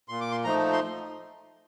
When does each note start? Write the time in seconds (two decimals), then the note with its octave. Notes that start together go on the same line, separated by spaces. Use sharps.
0.08 A#2 C6
0.21 D6
0.31 C6
0.44 F3 A3 D#4 A#5
0.73 C6